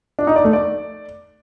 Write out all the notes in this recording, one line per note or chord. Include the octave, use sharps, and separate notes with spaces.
D4
D#4
D5
A3
D5